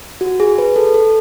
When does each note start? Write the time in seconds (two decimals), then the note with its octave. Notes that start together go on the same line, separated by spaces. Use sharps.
0.21 F#4
0.40 G#4
0.58 B4
0.76 A4
0.94 A4